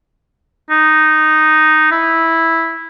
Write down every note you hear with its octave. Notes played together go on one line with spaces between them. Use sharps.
D#4
E4